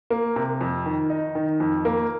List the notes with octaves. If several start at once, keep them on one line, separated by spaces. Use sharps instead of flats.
A#3
C3
F2
D#3
D#4
D#3
F2
A#3